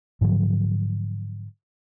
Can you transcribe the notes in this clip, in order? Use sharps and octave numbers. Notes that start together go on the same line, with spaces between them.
G#2 D3 F3 F#3